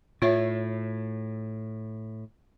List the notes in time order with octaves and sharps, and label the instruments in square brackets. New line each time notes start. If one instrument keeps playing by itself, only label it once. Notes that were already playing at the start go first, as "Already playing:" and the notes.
[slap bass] A2 [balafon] F4 C#5 E5